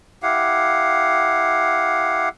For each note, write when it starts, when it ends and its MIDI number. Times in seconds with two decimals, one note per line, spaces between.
0.23 2.29 64
0.23 2.29 67
0.23 2.29 77
0.23 2.29 78